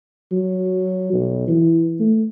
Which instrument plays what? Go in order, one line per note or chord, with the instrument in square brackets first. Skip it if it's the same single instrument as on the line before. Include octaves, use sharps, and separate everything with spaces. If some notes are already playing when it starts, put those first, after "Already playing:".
[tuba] F#3
B1
E3
A3